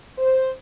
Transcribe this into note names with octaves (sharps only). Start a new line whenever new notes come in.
C5